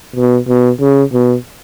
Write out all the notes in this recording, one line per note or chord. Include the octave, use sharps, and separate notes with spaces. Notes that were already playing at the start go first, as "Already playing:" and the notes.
B2
B2
C#3
B2